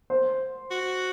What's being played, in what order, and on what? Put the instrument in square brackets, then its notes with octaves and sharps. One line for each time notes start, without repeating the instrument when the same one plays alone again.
[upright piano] C5
[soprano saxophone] F#4